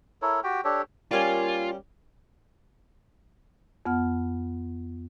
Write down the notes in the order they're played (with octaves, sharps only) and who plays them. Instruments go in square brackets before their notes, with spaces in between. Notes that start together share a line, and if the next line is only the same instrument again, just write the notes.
[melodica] E4 A4 A#4 C#5
F#4 G4 G5
D4 G4 A4 C#5
[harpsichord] G3 C#4 [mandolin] A#3 G#5 [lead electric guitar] F4
[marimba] F2 B3 F#5 F6